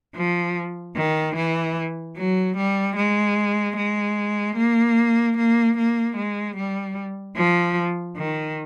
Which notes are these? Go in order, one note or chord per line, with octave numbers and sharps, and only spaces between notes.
F3
D#3
E3
F#3
G3
G#3
G#3
A#3
A#3
A#3
G#3
G3
F3
D#3